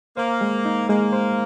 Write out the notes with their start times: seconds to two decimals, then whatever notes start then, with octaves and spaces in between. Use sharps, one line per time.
0.17 A#3 C5
0.41 G#3
0.65 D#4
0.89 G#3 A#3
1.13 C5